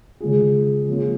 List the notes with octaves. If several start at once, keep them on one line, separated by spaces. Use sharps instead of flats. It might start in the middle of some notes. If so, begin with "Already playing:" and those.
C#3 G#3 C#4 F4 G#4
F3 A#3 C#4 F4 G#4